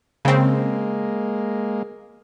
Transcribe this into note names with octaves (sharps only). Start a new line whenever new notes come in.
C#3 G#3 A#3 C4